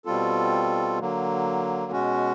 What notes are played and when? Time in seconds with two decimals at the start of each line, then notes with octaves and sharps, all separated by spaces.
0.05 B2 G3 C4 F4 A4
0.99 D3 F#3 A#3
1.92 B2 G#3 C#4 F#4